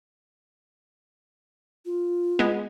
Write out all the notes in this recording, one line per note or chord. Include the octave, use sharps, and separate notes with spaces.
F4
G#3 B3